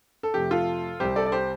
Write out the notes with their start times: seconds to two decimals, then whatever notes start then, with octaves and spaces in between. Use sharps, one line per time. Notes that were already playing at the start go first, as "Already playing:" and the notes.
0.23 A4
0.34 F2 C3 A3 G4
0.51 F4 A4
1.00 C2 C3 G3 G4 C5
1.16 A4 D5
1.26 D5
1.32 G4 C5